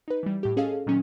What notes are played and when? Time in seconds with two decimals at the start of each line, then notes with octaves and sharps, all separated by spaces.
0.08 D#4 B4
0.23 E3 G3
0.43 A2 G4
0.57 C#4 G#4 A4 D#5 F5
0.87 A#2 D#3 F#3 C#4